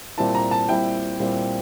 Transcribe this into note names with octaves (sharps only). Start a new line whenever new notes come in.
A#2 G3 C4 E4 A5
A#5
A5
A#2 G3 C4 E4 G5
A#2 G3 C4 E4